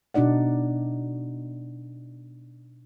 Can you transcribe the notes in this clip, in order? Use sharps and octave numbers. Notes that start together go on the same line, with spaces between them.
B2 D4 D#4 D5 F#5